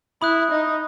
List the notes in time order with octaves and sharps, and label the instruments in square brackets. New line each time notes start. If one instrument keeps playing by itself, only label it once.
[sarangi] E4 [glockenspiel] B5 D#6 F#6
[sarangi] D#4